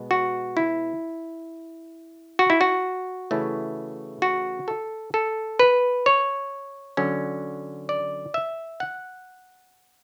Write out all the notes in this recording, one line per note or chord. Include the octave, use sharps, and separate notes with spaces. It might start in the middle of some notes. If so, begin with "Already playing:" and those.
Already playing: B2 G#3 B3
F#4
E4
F#4
E4
F#4
C#3 E3 A3 C#4 E4
F#4
A4
A4
B4
C#5
D3 F#3 C#4
D5
E5
F#5